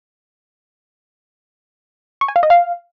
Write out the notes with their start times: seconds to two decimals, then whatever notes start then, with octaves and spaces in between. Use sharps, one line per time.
2.21 C#6
2.28 G#5
2.36 F5
2.43 D#5
2.50 F5